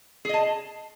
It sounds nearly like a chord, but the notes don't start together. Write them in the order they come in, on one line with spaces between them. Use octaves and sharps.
G#4 D#5 A5